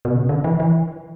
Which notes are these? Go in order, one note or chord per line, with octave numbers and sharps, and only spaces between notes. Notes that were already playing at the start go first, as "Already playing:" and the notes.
B2
C#3
D3
E3
E3